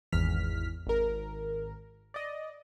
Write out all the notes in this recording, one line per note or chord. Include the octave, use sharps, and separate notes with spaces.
G#1 E2 F6 B6
G#1 A#4
D5 D#5